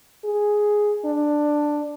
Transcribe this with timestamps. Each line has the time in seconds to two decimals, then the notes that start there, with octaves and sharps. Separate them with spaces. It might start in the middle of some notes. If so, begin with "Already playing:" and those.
0.24 G#4
1.05 D4